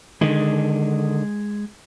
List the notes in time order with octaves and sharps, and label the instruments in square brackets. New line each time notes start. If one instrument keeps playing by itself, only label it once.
[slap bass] D3 D#3 [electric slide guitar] G#3 G#4 D#5